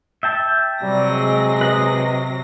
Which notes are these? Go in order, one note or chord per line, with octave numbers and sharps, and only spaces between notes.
E5 G5 A5
C3 F#3 G3 A#6
G#3
B4 D#5 D#6